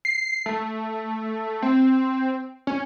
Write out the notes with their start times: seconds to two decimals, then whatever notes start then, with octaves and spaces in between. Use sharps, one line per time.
0.05 C7
0.46 A3
1.62 C4
2.67 C#4